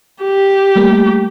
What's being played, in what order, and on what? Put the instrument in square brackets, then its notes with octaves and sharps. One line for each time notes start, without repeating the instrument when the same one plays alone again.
[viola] G4
[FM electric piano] G3 A3 A#3